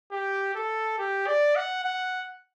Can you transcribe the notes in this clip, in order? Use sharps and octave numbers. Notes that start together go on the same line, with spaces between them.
G4
A4
G4
D5
F#5
F#5